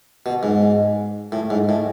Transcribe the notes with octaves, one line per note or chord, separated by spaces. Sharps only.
B2
G#2
A2
G#2
A2